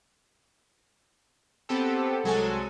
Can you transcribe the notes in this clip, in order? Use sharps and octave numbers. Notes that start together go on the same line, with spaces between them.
B3 C4 G4 A4
C2 F#3 G#3 A4 G#5